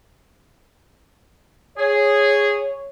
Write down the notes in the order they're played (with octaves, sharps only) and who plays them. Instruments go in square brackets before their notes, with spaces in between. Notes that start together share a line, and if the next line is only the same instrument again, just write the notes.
[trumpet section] G#4 [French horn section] C#5